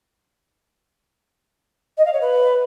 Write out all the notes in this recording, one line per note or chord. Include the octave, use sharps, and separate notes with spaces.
D#5
F5
C#5
B4